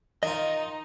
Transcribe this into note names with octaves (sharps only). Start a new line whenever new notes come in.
D#3 D#4 F4 D#5